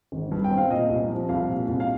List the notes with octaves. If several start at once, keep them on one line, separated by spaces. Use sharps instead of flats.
G#1
G2
G5
C4
F5
A#2 D#5
C2
F3
C2 F5
A#2
C2
F5